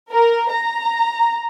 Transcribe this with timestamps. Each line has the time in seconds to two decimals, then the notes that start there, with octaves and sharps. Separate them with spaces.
0.11 A#4
0.51 A#5